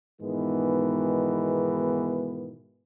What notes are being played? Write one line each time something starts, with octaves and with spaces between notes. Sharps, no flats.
G#2 B2 D#3 E3 G#3 B3